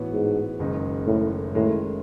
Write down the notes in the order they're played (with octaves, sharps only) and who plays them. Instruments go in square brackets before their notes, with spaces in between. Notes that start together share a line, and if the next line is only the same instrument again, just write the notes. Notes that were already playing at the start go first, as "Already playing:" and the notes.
Already playing: [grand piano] A2 E3 B3 F#4 C#5
[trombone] G#2
[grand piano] F#1 F#2 D#3 G#3 D#4
[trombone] A2
[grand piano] F#2 D#3 G#3 [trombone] A2